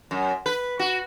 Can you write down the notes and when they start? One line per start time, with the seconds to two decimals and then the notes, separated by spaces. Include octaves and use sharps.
0.11 F#2
0.46 B4
0.79 F#4